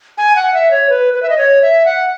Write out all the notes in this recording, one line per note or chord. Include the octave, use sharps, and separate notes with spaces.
G#5
F#5
E5
C#5
B4
B4
E5
D#5
C#5
E5
F#5